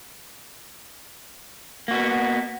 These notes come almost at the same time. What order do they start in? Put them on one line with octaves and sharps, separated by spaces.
A#3 F#4 B3